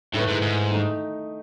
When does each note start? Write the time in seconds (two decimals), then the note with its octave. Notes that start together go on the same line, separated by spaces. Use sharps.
0.13 A2 D#3 A3 E4 B4
0.28 G#2
0.42 G#2
0.70 D#3 A3 D#4